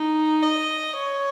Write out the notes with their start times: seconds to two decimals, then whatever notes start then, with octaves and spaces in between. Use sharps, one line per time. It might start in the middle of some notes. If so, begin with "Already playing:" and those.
Already playing: D#4
0.42 D#5
0.96 C#5